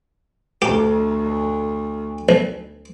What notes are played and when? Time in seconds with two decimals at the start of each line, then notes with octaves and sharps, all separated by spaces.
0.62 D2 G4
2.29 B1